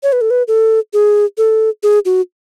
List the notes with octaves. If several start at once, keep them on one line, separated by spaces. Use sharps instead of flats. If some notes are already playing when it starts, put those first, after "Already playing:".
C#5
B4
A4
B4
A4
G#4
A4
G#4
F#4